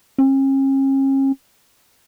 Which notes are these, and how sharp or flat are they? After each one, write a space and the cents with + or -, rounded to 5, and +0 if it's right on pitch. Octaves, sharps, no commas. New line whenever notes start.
C#4 -40